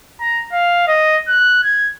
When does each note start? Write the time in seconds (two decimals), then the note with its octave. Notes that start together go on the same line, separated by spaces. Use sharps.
0.20 A#5
0.53 F5
0.88 D#5
1.28 F#6
1.63 G#6